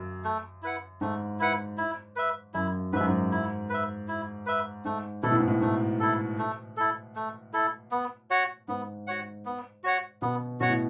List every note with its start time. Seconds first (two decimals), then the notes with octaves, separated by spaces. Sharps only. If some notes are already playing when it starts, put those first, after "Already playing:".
Already playing: F#2
0.24 A3
0.63 E4 B4 F#5
1.01 G#2 A3
1.39 E4 B4 F#5
1.78 E4
2.16 B4 E5
2.54 F#2 E4
2.93 G#2 B4
2.96 F#2 E5
3.09 G#2
3.32 E4
3.70 B4 E5
4.08 E4
4.46 B4 E5
4.85 G#2 A3
5.23 B2 E4 A4
5.31 A2
5.40 G#2
5.48 A2
5.62 G#2 A3
6.00 E4 A4
6.38 A3
6.77 E4 A4
7.15 A3
7.53 E4 A4
7.91 B3
8.30 F#4 C#5 F#5
8.68 G#2 B3
9.07 F#4 C#5 F#5
9.45 B3
9.84 F#4 C#5 F#5
10.22 B2 B3
10.60 B2 F#4 C#5 F#5
10.70 A2